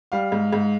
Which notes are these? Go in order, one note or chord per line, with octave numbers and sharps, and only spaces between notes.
G3 F5
G#2
G#2